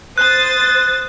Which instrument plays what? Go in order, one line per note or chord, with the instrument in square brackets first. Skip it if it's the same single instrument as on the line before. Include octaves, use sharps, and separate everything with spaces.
[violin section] C5 D#6 A6 [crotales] F#6